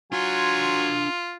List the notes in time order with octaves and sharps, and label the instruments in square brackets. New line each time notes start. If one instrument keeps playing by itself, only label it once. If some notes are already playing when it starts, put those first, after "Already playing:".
[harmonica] F#3 G#5 [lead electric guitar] D4 C6 [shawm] F4